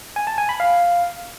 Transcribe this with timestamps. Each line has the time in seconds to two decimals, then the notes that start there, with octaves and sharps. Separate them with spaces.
0.16 G#5
0.27 A5
0.38 G#5
0.49 B5
0.60 F5